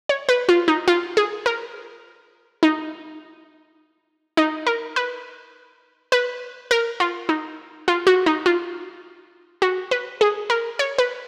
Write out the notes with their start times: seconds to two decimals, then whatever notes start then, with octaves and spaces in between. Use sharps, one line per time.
0.09 C#5
0.29 B4
0.49 F4
0.68 D#4
0.88 F4
1.17 G#4
1.46 A#4
2.63 D#4
4.37 D#4
4.67 A#4
4.96 B4
6.12 B4
6.71 A#4
7.00 F4
7.29 D#4
7.88 F4
8.07 F#4
8.26 D#4
8.46 F4
9.62 F#4
9.91 B4
10.21 G#4
10.50 A#4
10.79 C#5
10.98 B4